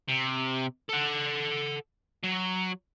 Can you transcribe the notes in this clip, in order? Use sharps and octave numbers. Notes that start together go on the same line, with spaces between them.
C3
A4 F#5
F#3